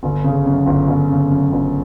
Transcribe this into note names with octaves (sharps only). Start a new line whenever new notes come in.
G1
C#3
F#2
G1
G1
C#3
F#2
G1